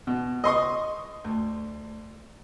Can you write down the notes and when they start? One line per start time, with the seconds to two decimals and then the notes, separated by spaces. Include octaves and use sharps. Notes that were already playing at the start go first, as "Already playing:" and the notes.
0.07 B2
0.44 D#5 C6 C#6 D#6
1.24 D2